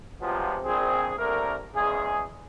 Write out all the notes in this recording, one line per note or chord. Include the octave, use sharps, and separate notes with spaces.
C3 F3 F#3 G#3 B3 F4
A#1 C4 G#4
C2 D3 A3 A#3 A#4
E2 C#3 G#3 G#4